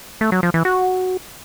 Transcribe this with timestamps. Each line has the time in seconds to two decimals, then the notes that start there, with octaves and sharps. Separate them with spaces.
0.21 A3
0.32 F#3
0.43 F3
0.54 E3
0.65 F#4